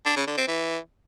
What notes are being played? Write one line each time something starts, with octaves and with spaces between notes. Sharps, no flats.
D4
C#3
D3
C4
E3